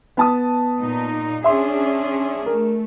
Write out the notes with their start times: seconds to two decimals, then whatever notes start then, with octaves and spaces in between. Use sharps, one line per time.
0.17 B3 A5 D#6
0.82 A#2 D#4
1.44 C#4 D4 G#4 E5 C6
2.46 A3 A#4